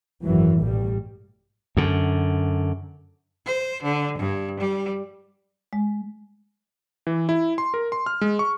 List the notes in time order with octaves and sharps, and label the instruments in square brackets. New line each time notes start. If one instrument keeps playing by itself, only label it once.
[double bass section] G#1 F#2 E3 F#3
A1 G2 B2 G3
[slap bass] F#2 D3
[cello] C5
D3
G2
G3
[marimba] G#3
[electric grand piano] E3
E4
C6
A#4
C6
F6
G#3
C#6